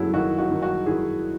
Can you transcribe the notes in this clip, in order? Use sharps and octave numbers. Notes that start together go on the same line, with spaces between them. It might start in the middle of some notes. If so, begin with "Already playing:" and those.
Already playing: F#1 F#3 E4 F#4 G#4 A4
D#3 D#4 F#4
D#4 F#4
D#3
D#4 F#4
D#3 E4 G#4